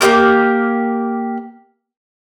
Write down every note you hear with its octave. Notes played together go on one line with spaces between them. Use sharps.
A#3 C4 G4 A#4